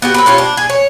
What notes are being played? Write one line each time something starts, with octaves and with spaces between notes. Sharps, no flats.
B3 F#4 G4
C4 A#4 B4
C#4 F4 G4 C#5
D4
G#4
C#5